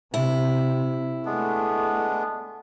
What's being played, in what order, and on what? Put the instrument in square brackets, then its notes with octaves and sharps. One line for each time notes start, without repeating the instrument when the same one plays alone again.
[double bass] C3 [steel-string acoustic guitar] E4
[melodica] G#3 B3 D4 [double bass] A3